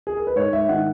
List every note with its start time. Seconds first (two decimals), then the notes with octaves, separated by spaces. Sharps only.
0.07 G#4
0.17 A#4
0.27 B4
0.36 G#2 C#5
0.53 E5
0.69 D#3 F#5